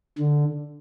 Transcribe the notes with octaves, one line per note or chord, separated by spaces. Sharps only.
D3